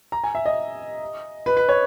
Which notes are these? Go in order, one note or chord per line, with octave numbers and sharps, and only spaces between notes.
A#5
G#5
E5
D#5
B4
B4
C#5